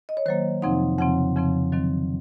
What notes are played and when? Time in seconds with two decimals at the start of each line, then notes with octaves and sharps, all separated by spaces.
0.09 D#5
0.17 C#5
0.26 D#3 F#3 A#3 C5
0.62 F2 C3 F3 C4 D#4 F#5
0.98 F2 C#3 F3 C4 F#5
1.36 F2 C#3 F3 C4
1.73 D#3 F#3 C4